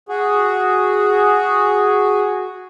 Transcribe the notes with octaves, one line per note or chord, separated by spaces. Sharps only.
F#4 G#4